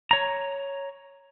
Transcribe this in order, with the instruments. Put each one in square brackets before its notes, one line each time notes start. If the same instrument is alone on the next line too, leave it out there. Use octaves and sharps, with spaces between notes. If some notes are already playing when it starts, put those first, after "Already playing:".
[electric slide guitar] C#5 A#5